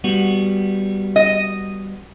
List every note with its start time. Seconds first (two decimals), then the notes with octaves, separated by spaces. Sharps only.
0.04 G3 B3 F#4
1.16 D#5